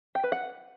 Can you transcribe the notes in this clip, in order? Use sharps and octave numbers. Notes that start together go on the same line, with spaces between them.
G5
B4
F#5